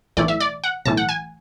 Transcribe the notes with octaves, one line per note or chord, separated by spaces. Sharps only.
B1 A2 E3 A3 D5
E5
D5
F#5
B1 A2 E3 A3 A5
F#5
G#5